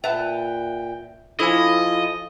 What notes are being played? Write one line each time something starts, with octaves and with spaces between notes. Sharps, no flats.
A#2 B4 E5 F#5 G5 A5
F3 E4 F4 A4 C5 D#5 G#5